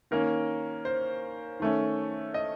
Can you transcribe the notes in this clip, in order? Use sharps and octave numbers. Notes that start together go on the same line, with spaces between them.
D#3 A#3 C#4 A#4
C5
D#3 A3 C#4
D#5